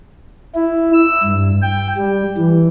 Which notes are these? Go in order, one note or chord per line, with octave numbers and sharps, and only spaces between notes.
E4
E6
G2
G5
G3
E3